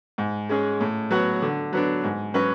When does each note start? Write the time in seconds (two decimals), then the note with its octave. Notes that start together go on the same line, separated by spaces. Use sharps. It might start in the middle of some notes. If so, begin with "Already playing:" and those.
0.18 G#2
0.49 G#3 C#4 G#4
0.80 A2
1.10 F#3 B3 F#4
1.42 D3
1.73 F#3 B3 D4
2.04 G#2
2.34 F#3 C#4 F#4 B4